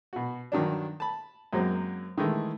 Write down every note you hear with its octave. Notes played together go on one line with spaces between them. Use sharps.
B2 F#4
G2 D#3 F#3 D4
A5 B5
F#2 F#3 G#3 A#3 C4
D#3 E3 G#3 A3